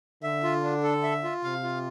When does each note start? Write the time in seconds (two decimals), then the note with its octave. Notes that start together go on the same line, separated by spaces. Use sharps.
0.23 D3 E5
0.43 F4
0.63 D4
0.83 A4
1.03 E5
1.24 F4
1.44 C3 F5
1.63 F4